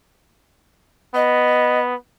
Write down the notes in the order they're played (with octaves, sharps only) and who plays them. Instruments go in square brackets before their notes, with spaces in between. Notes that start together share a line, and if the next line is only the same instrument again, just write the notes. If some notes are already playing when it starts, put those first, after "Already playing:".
[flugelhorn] B3 [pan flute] D#5